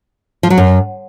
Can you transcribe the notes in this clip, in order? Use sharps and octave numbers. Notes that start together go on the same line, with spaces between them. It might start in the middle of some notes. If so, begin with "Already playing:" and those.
F3
F#3
F#2